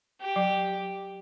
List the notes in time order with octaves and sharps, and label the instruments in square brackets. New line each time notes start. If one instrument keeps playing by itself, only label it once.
[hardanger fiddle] G4
[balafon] F#3